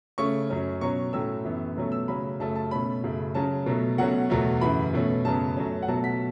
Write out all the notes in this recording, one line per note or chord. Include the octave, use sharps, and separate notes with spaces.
C#3 A3 C#4 C#6
F#2 F#3 C#4
B2 F#3 C#4 C#6
A2 F#3 A3 C#4 E6
F#2 E3 B3
B2 F#3 A3 C#4
E6
C#3 F#3 A3 C#4 B5
F#2 C#3 A3 C#4 A5
A5
B2 A3 C#4 B5
F#2 C#3 A3
C#3 F#3 C#4 A5
B2 F#3 A3
B2 F#3 A3 C#4 F#5
E2 B2 F#3 A3
F#2 C#3 E3 B5
B2 A3 C#4
F#2 C#3 F#3 B3 A5
F#2 F#3 A3 C#4
F#5
B2 F#3 A3 A5
B6